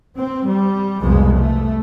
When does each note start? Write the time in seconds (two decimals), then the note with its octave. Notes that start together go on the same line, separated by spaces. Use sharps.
0.18 C4
0.48 G3
1.01 C2 F2 B2 F3 G#3
1.37 A3